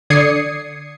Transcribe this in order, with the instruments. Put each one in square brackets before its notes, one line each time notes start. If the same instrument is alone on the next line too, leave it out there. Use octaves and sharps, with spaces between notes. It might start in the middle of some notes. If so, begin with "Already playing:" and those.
[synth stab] D3 D5 D#6 G#6 C7 C#7